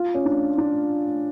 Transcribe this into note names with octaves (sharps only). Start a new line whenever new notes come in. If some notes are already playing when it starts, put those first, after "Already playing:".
Already playing: F4
C#4
D4
D4